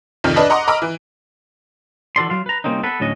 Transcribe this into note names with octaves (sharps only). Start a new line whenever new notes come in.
C2 F2 D#3 F3
D4 B4 D5 D#5 A5 B5
D#5 F#5 A#5 C6 D6 D#6
D#5 A#5 B5 D6 E6 F6
E3
E3 F#4 A4 D5 C6
F#3 F5 C6
B4 A#5
C2 A#3 C4 C#4 D#4
B3 A4 B4
D2 A2 F#3 C#4 D#5